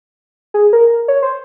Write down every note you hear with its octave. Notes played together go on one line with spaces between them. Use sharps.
G#4
A#4
C#5
C5